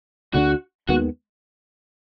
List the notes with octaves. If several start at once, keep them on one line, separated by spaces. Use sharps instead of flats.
D2 D3 F#3 D4 F#4
D#2 D#3 G#3 B3 F#4